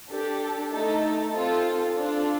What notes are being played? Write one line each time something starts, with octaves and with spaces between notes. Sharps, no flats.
D4 G4 A4
A3 D#4 A4
C4 F4 A4
D4 F4 A4